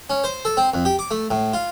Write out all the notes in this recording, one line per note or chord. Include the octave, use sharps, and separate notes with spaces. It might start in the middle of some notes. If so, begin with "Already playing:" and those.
C#4
C5
A4
C4
F2
G4
D6
A3
A2
F4